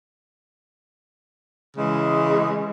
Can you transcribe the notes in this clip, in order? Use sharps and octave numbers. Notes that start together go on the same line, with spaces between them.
C#3 E3 G#3